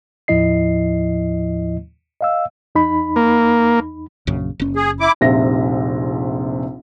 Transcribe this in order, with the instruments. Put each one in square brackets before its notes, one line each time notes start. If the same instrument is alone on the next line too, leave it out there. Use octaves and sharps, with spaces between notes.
[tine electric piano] D#2 A2 F3 E4 D#5 C7
D#5 F5 E6
[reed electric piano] E2 D#4 B5
[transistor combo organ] A#3
[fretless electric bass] A#1 F#2 C#3
F#1 C#4
[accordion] G#4
E4 D6
[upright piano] F1 A#1 C3 E5 A#6